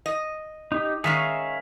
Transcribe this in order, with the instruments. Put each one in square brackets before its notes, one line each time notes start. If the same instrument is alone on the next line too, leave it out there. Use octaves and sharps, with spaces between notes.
[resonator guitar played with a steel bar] D#5
[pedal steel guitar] D#4 G4
[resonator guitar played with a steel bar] D#3 G#3 C#4 [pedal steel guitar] G#4 E5 F5